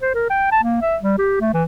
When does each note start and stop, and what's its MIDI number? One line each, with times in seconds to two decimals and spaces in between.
0.02 0.10 72
0.14 0.26 70
0.30 0.49 79
0.51 0.59 81
0.63 0.79 58
0.81 0.97 76
1.02 1.15 55
1.18 1.36 67
1.40 1.52 57
1.53 1.64 52